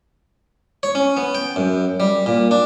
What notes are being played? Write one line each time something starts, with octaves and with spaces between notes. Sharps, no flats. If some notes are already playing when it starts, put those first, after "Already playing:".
C#5
C#4
B3
G5
F#2
G3
A#2
D4